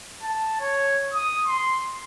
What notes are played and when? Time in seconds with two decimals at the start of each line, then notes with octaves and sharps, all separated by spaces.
0.23 A5
0.61 C#5
1.14 D#6
1.47 C6